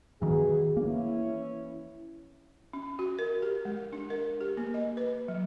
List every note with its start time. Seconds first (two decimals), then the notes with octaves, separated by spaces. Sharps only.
0.22 D#3 E3 B3 F#4 G#4
0.77 E3 A#3 C#4 E4
2.73 C#4
2.99 F#4
3.19 A#4
3.42 G4
3.65 G#3
3.93 D4
4.10 A#4
4.41 G4
4.57 A#3
4.74 D#5
4.97 B4
5.28 F#3